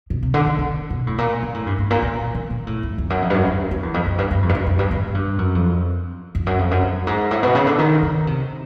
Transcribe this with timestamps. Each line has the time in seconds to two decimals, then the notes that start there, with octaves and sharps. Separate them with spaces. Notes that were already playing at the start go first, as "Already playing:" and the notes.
0.10 B2
0.23 C3
0.34 D3
0.46 D3
0.58 D3
0.90 B2
1.07 A2
1.18 A#2
1.43 A#2
1.54 A2
1.66 G2
1.78 G#2
1.90 A#2
2.03 A#2
2.35 A#2
2.50 A#2
2.67 A2
2.83 F2
2.98 F2
3.10 F#2
3.22 F2
3.30 G2
3.35 F#2
3.47 F#2
3.71 F#2
3.83 E2
3.94 F2
4.06 F#2
4.18 G2
4.31 G2
4.42 F2
4.49 G2
4.55 F#2
4.67 F#2
4.79 G2
4.91 G#2
5.14 G2
5.38 F#2
5.55 F2
6.35 F2
6.47 F#2
6.59 F2
6.71 F#2
6.82 G2
7.07 G#2
7.31 A2
7.43 B2
7.55 C#3
7.67 D3
7.78 D#3
8.03 C#3
8.27 C3